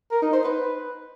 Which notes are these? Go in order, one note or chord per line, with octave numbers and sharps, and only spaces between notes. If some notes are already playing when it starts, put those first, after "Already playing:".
A#4
D#4
C5
B4